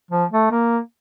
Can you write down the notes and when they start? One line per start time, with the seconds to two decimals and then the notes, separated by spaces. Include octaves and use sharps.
0.11 F3
0.32 A3
0.51 A#3